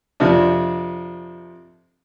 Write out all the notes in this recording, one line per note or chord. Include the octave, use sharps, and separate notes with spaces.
F2 C3 D4